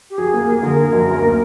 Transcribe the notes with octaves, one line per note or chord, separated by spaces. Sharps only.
G4
F#3 G#4
A#3
A#3
D3 A#4
A#3
F#2
D2
A#3